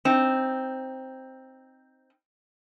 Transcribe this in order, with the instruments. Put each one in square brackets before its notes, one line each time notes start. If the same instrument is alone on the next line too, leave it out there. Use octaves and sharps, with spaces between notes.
[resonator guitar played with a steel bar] C4 D#4